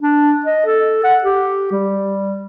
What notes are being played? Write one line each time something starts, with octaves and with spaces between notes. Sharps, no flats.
D4
D#5
A4
F#5
G4
G3